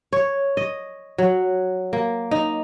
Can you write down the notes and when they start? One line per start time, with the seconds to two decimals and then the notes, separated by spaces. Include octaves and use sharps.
0.13 C#5
0.57 D#5
1.18 F#3
1.93 A#3
2.31 D#4